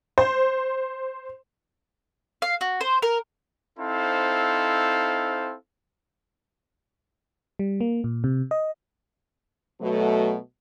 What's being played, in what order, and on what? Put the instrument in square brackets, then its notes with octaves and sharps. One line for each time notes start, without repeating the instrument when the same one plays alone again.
[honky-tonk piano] C5
[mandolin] F5
F#4
C5
A#4
[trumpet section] C4 D#4 E4 A4 C5 F5
[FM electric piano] G3
A#3
A#2
C3
D#5
[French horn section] B2 F#3 A3